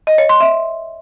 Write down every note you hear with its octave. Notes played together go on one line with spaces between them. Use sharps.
D#5
C#5
C6
E5